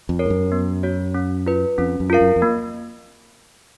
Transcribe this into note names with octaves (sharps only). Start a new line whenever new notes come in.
F2
A#4 C#5
G#2
F#2
B3
F#4 C#5
C#4
F4 B4
F2 C#4
F#2
F4 A#4 F5
F#2
F2
A#3